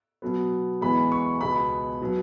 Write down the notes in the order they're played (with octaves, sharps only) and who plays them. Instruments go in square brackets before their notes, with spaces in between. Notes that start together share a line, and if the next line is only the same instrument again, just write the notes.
[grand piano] B2 F#3 B3
E2 E3 G#3 B3 B5
C#6
C#2 B2 G#3 B3 B5
B2 F#3 B3